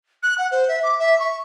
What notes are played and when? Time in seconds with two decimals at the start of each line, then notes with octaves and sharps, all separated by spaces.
0.23 F#6
0.38 F#5
0.51 C5
0.68 E5
0.83 D6
0.99 E5
1.19 C#6